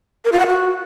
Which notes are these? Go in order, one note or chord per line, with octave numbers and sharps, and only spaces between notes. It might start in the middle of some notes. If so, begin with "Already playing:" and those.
A#4
F4
F#5
F#4